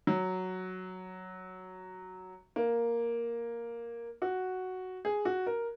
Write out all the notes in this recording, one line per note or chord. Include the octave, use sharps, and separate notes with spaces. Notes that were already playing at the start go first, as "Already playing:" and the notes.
F#3
A#3
F#4
G#4
F#4
A#4